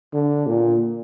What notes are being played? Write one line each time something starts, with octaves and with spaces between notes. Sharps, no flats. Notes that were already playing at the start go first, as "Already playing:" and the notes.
D3
A#2